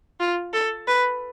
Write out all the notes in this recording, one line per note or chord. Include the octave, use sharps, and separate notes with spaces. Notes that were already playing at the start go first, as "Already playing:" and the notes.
F4
A4
B4